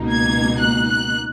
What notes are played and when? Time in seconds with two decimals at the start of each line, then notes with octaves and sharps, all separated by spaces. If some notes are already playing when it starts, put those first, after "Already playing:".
Already playing: C#2 B2 A#3 D#4
0.12 G#6
0.58 F#6
0.88 F#6